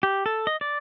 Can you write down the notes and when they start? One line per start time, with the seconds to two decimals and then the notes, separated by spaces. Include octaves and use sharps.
0.03 G4
0.26 A4
0.47 D#5
0.61 D5